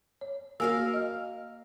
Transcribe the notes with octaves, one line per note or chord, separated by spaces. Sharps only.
C#5
A#3 F#4 A#4 F5 G#5 E6
D#5 F6